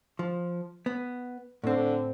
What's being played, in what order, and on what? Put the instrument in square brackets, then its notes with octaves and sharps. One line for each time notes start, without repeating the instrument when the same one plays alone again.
[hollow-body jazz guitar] F3
B3
[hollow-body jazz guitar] A2 C4 [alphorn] D3